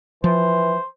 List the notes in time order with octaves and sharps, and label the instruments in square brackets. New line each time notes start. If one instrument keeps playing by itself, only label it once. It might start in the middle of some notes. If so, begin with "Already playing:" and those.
[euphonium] E3 [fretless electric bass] F3 [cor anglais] C5